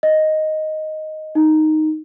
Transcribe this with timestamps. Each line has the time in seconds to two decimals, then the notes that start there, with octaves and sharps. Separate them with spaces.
0.03 D#5
1.35 D#4